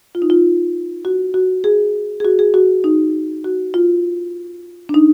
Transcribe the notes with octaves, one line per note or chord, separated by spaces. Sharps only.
F4
D#4
F4
F#4
F#4
G#4
G#4
F#4
G#4
F#4
D#4
F#4
F4
D4
D#4